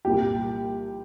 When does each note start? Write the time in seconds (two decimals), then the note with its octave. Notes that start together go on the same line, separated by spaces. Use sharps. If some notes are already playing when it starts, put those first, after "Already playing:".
0.05 C2 A#2 F3 G4